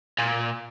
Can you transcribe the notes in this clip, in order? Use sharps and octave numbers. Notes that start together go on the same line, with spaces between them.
A#2